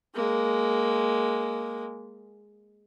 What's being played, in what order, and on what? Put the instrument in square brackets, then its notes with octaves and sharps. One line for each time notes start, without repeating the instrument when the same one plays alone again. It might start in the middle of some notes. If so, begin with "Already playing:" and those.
[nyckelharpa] G#3 A#3